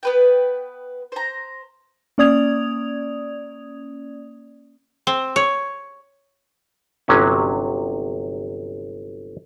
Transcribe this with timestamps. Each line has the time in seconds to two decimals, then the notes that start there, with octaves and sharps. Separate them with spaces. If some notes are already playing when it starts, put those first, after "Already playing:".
0.03 B3 B4 G5
1.12 C5 A#5
2.18 A#3 C#4 D5 D#6 G#6 F7
5.07 C4
5.36 C#5
7.08 G1 C3 F#3 C#4